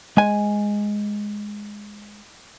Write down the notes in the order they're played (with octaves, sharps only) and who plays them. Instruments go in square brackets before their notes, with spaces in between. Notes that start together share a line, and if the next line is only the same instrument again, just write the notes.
[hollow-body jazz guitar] G#3 G#5